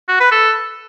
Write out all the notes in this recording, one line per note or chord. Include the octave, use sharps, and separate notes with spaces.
F#4
B4
A4